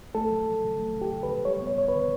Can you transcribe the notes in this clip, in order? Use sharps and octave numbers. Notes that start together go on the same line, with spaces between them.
A3 A4
F#3
F#3
C#3
A3
C#3
G4
C#3
B4
C#3
G3 C#5
B3
C#5
F#2 C#5
B4
D3